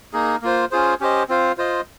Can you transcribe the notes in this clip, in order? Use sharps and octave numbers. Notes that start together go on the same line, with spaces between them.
A#3 D#4 G#4
A#3 F4 C5
C#4 F4 G#4 C5
C#4 G4 C5 D#5
C4 F4 C5 F5
F4 C5 D#5